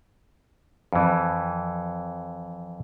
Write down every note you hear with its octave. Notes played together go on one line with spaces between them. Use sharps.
F2 E3